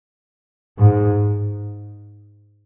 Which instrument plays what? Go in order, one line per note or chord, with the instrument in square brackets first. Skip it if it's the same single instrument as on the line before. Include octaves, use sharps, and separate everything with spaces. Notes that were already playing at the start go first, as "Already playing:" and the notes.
[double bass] G#2